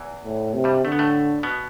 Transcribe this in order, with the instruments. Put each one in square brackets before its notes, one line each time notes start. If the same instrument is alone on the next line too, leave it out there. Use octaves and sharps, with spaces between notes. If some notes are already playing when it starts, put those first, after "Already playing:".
Already playing: [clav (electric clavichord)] E2 E3
[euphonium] A2
C3
[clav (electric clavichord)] G2 G3
[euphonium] D3 [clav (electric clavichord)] A3
[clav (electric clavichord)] B3
A2 A3
B2 B3